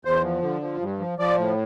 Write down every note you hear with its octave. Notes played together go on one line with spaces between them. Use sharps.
E2 C5
F3
D3
F3
G2
F3
F3 D5
A2